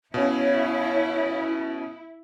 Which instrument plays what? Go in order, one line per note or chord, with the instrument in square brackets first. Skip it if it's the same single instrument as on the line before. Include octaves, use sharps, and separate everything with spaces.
[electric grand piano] B2 C#4 [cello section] E4 [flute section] C#5 F5